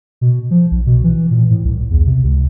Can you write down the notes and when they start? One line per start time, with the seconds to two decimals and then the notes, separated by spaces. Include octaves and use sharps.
0.21 B2
0.51 F3
0.71 B1
0.86 B2
1.04 E3
1.31 A#2
1.50 A2
1.65 C2
1.91 E2
2.06 C3
2.24 C#2